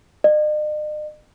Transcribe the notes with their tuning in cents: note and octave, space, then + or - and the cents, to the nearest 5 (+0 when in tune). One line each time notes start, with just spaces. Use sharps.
D#5 -45